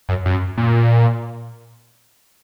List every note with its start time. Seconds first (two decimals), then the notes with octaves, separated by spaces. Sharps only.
0.09 F#2
0.26 F#2
0.58 A#2